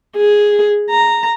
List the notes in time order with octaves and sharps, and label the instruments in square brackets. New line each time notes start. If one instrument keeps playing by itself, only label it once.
[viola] G#4
A#5